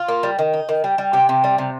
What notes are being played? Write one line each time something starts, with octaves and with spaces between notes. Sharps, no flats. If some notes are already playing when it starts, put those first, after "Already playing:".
Already playing: F4
A#3
G3
D#3
D#4
D#3
G3
G3
C3 G4
C3
G3
C3